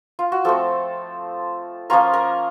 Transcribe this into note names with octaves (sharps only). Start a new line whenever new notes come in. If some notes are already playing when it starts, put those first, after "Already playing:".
F4
F#4
F3 A3 C4 A4
F3 A#3 C#4 F4 A#4
A#4